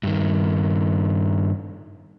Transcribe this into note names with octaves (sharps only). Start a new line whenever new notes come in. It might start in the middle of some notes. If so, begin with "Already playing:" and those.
G2 D#3